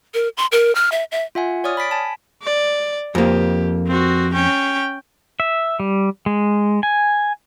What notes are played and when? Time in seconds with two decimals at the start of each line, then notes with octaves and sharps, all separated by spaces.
0.14 A#4
0.37 C6
0.52 A#4
0.75 F6
0.92 E5
1.12 E5
1.35 F4 E5 F#5 G#5
1.64 C#5 D5 G#5 D#6 F6
1.77 B5 A6 B6 D7
1.91 G#5 A5
2.42 D5
3.15 F2 A#3 G4
3.87 C4 F#4
4.33 C#4 G5
5.40 E5
5.80 G3
6.26 G#3
6.83 G#5